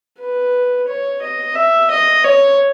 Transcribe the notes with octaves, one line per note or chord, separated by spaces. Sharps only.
B4
C#5
D#5
E5
D#5
C#5